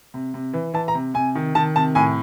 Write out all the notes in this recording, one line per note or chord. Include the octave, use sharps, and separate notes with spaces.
C3
C3
E3
E3 A5
A#5
C3
C3 G#5
D#3
D#3 A5
C3 A5
A2 G#5